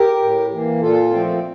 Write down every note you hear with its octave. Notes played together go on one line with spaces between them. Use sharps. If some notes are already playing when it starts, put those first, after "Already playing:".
Already playing: G4 A#4
A2
E3 A#3
A#2 F4 A4
F3 A3 C4